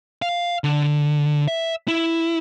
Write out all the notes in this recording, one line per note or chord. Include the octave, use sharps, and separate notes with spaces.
F5
D3
E5
E4